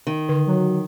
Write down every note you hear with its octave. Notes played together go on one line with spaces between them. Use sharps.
D#3
D3
F#3